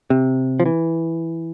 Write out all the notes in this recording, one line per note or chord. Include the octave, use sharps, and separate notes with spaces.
C3
F3
E3